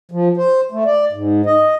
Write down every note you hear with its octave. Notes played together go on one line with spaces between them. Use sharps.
F3
C5
A3
D5
G#2
D#5